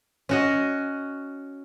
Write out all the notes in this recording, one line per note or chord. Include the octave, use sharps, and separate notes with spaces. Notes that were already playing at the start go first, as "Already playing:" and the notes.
C#4 F#4 D#5